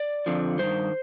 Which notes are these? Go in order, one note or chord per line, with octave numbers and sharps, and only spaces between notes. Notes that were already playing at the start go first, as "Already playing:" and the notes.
Already playing: D5
F2 D3 F3
G2 D#3 C5